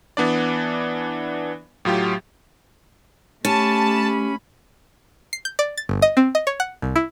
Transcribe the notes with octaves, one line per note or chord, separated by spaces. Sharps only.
E3 B3 D4 D5
A2 F#3 F4 G4
A3 C#4 G4 A5 B5
C7
G6
D5
A6
G1
D#5
C4
D#5
C#5
F#5
C2
E4